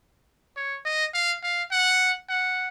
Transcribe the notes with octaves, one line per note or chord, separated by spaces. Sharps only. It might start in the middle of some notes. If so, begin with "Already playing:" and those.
C#5
D#5
F5
F5
F#5
F#5